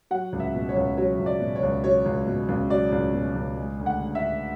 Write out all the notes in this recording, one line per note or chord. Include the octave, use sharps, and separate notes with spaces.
F#3 F#5
C#2
E5
B2
C#5
C#2
F#3 C#5
C#2
D5
B2
C#5
C#2
F#3 C#5
C#2
B2
C#2
F#3 D5
C#2
B2
C#2
G#3
D2
F#5
D3
E5
D2